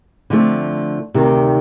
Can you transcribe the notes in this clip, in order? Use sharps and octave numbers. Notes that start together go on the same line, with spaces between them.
D3 F3 A3 C4
D2 C3 D#3